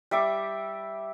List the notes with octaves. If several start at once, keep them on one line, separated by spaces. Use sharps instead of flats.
G3 E5 D6